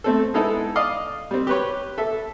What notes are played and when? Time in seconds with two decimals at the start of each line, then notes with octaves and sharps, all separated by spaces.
0.04 A3 C4 A4
0.34 G#3 B3 D#4 E4 A4
0.76 D5 D#5 F5
1.31 G3 C4
1.47 G4 B4 C#5
1.98 A4 E5